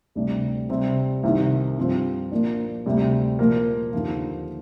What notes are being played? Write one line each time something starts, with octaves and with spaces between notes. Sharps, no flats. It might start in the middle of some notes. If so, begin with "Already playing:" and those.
D2 C3 G3 D4
C3 G3 C4
C2 C3 D#3
G2 F3 C4 F4 C5
A#2 F3 A#3 D4
D2 C3 G3
A#2 F3 A#3
D#2 D3 F3